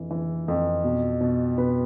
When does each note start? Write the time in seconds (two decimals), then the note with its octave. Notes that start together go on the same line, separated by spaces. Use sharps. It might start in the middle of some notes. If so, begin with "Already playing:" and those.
Already playing: F2 E3
0.10 E3
0.48 F2
0.84 B2
1.21 B2
1.58 B2 B4